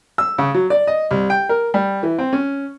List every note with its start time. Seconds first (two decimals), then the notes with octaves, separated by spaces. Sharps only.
0.18 E6
0.38 C#3
0.54 F#3
0.70 D5
0.87 D#5
1.11 C2
1.30 G5
1.49 A#4
1.74 G3
2.03 E3
2.19 C4
2.33 C#4